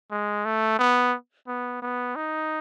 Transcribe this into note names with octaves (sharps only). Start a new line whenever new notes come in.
G#3
A3
B3
B3
B3
D#4